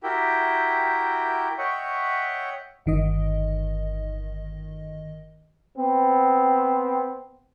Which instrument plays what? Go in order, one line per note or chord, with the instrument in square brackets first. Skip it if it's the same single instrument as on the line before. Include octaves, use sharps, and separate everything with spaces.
[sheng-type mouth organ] E4 F#4 G4 A#4 E5 G5
C#5 D#5 E5 F#5 G5 C#6
[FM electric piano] G1 D#3 D#5
[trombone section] B3 C4